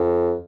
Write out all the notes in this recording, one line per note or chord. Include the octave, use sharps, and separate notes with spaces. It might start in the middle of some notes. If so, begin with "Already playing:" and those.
Already playing: F2